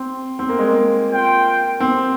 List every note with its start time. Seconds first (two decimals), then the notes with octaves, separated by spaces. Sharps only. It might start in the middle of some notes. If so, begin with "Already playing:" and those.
Already playing: C4
0.39 C4
0.49 A#3
0.59 G#3
0.69 A#3
1.10 F4 C5 G5
1.80 C4